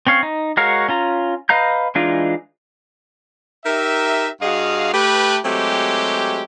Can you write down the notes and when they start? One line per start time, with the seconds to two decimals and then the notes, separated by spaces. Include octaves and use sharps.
0.07 C4 C#4 C#5 F5
0.23 D#4
0.57 G#3 F#4 A#4 C#5 F5
0.88 C#4 F4 A#5
1.49 B4 D#5 F5 A#5 G6
1.95 E3 G#3 D4 D#4 F4
3.65 D#4 G4 A#4 E5
4.41 G2 F#4 G#4 D#5 F5
4.93 A3 G4 B4
5.44 F#3 G#3 A3 C4 G4